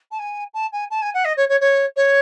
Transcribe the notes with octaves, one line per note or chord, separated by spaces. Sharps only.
A5
G#5
A5
G#5
A5
G#5
F#5
D#5
C#5
C#5
C#5
C#5